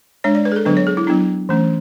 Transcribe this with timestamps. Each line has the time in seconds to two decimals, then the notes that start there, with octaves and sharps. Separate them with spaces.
0.24 G#3 D4 C#5
0.35 D5
0.45 B4
0.52 G#4
0.56 A4
0.65 D3 F#3 B3 D4 B4
0.77 C#5
0.87 G#4
0.97 E4
1.07 F#3 B3 D4 E4
1.49 E3 A3 C#4